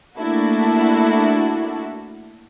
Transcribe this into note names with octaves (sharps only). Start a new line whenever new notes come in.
A3 A#3 D4 E4 F#4 A4